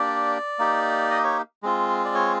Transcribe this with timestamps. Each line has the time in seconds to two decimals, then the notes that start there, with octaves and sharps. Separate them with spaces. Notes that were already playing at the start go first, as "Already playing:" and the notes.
Already playing: A#3 D4 G4 D5
0.59 A#3 D#4 G4
1.11 D#5
1.24 C#5
1.63 G#3 C4 F4
2.05 D5
2.15 C#5